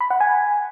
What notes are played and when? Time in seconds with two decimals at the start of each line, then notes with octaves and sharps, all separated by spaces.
0.01 B5
0.10 F#5
0.20 G#5